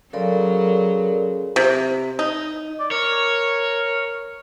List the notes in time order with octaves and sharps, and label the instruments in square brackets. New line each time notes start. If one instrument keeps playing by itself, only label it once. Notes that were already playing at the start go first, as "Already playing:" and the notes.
[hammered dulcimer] C#3 C6 [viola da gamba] F#3 [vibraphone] A4 A#4 D5
[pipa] C3
D#4
[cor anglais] D5
[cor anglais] A#4 [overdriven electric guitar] C#5